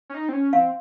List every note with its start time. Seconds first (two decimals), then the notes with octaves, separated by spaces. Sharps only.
0.09 C#4
0.14 D#4
0.29 C4
0.33 C#4
0.53 C4 F5